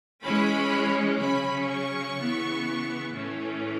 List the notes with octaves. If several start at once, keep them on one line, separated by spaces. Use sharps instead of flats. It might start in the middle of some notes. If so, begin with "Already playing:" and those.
E3 G#3 C#4 B5
C#3 F#3 C#4 B5
C#6
C#3 E3 B3
A2 E3 A3 C#4